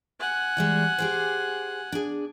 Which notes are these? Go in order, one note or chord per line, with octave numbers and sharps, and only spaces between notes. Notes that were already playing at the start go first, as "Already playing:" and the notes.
F#5 G#5
E3 G3 G#3
G4 G#4 C5
D4 G#4